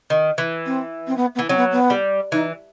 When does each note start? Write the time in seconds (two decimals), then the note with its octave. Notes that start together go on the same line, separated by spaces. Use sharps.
0.10 D#3
0.38 E3
0.66 C4
1.07 C4
1.17 B3
1.35 B3
1.39 E3
1.49 F#3 C4
1.57 B3
1.72 B3
1.90 G3
2.32 E3 D#4